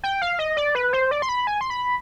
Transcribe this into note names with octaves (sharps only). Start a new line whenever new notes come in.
G5
F5
D#5
D5
B4
C5
D5
C6
B5
G#5
C6
B5